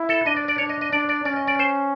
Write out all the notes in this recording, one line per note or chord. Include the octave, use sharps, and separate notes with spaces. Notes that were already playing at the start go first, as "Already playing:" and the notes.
Already playing: E4
A4
D4 D#5
D5
D5
D4 C#5
D#5
D#5
D4 D5
D5
C#4 D5
D#5
D5
C5